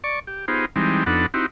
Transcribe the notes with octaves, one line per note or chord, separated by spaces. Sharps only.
D5 C#6
G4
B3 D#4 F4 G4 G#4 C5
E3 G3 G#3 C4 D#4
F2 B3 D4 D#4 A4 F#5
C4 D#4 E4 F#4 G4